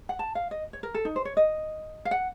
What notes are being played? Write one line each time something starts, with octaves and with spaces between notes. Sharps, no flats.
F#5
A5
F5
D#5
C#5
A#4
A4
D#4
C5
C#5
D#5
F5
F#5